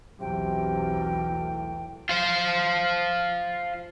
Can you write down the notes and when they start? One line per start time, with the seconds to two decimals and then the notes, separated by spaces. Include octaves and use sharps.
0.20 B1 E2 C3 F#3 G5
1.30 A2
2.09 F4 C5